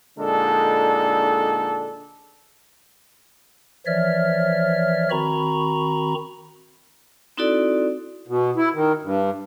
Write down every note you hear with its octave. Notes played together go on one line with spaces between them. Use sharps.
A#2 D3 G#3 D4 D#4 A4
E3 F3 C#5 D5 E5 F6
D#3 C4 F#4 A#5 B5 C#6
C4 D#4 E4 F#4 A4 D5
B2
E4
D#3
G2